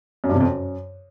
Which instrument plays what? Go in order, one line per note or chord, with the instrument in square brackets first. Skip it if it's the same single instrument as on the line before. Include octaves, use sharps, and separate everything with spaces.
[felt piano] F#2
G2
C3
F2
F#2